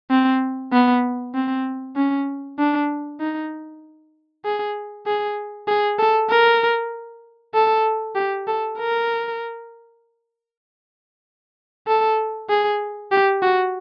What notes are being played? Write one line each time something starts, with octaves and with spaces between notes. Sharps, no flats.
C4
B3
C4
C#4
D4
D#4
G#4
G#4
G#4
A4
A#4
A4
G4
A4
A#4
A4
G#4
G4
F#4